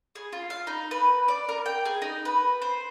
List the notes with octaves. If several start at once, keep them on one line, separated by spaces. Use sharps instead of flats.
G#4
F4
F5
D#4
B4
D5
A#4
G5
G#4
D#4
B4
C5